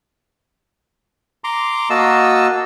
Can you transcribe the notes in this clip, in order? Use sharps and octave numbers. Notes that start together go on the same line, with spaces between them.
A#5 C6 D6
A#3 F#4 D#5 A5 E6